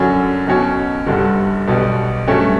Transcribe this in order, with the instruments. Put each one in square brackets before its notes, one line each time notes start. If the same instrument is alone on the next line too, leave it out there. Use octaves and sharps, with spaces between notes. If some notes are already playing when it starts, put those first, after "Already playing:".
Already playing: [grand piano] F#2 D3 F#3 C#4
B1 B2 F#3 C#4
G1 G2 D3 G3
B1 B2 G3 B3
G2 F#3 A3 C#4